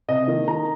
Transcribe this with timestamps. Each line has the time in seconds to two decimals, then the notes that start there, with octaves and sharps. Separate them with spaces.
0.08 C3 D#5
0.28 D#3 A#3
0.48 D#3 A#5